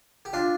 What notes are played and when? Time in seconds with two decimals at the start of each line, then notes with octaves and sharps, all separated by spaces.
0.25 G4
0.33 D4 F4